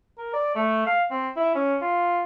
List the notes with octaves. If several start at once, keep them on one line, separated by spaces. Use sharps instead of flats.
A#4
D5
A3
F5
C4
E4
C#4
F4